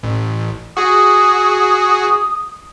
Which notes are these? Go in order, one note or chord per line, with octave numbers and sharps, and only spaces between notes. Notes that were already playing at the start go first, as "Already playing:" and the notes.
A1
F#4 G#4 D#6